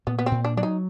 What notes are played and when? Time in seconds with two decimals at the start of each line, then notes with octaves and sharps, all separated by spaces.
0.07 A#2 B3
0.19 B3
0.26 C4
0.32 A#2
0.45 D4
0.57 F#3 D4
0.63 D#4